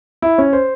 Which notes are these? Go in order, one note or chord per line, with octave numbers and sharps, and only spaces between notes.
E4
C#4
C5